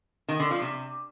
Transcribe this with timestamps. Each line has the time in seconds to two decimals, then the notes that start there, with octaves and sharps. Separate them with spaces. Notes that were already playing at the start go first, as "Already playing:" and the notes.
0.28 D#3
0.40 D3
0.51 F3
0.62 C3